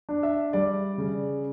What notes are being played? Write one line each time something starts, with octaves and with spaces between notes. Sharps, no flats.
D4
E5
G3 D5
C#3